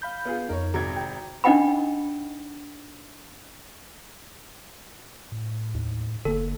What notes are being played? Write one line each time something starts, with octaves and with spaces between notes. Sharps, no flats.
F5 B5 G6
B3 F4 G#4
F2 D#4 A#4 C#5
G#1 C3 F#4 A#5 G#6
G5
D4 D#4 D#5 F#5 G5 B5
A2
D#2
F#1 D3 A#3 A4